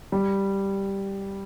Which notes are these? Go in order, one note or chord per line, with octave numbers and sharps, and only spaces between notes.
G3